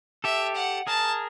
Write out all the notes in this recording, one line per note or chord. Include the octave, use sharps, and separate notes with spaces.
G4 A4 E5
F#5
G#4 A#4 A5